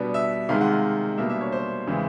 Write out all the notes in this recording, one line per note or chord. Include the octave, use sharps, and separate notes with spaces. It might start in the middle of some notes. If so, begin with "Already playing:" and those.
Already playing: B2 G3 B3 D4
E5
C3 D#3 G#3 F5
F#5
F5
B2 G3 A#3 D4 E5
E5
C#5
C5
C#3 E3 G#3 C4